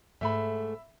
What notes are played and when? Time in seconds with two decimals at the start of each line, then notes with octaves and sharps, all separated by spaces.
0.21 G#2 A3 E5 B5